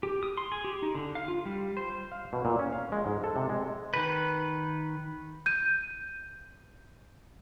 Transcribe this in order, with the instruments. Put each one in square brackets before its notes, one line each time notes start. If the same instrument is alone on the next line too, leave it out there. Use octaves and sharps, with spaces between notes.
[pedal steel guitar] G4
D#6
C6
G#4
G4
D#4
D3
F5
F4
G3
C5
[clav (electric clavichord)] F5
B2
A#2
C#4
F5
G#3
G#2
A4
C3
G#3
[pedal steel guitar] D#3 B4
[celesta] G6 D#7